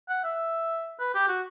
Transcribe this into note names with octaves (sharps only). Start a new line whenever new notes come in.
F#5
E5
B4
G4
F#4